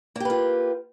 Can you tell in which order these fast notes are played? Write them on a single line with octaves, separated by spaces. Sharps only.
A#3 G4 B4 F4